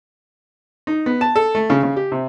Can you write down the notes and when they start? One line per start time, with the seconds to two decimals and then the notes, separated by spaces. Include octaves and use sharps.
0.87 D#4
1.06 B3
1.21 A5
1.36 A4
1.55 A3
1.70 C#3
1.83 C#3
1.96 G4
2.12 C3